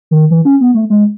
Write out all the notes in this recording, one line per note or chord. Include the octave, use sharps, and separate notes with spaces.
D#3
E3
C#4
B3
A3
G#3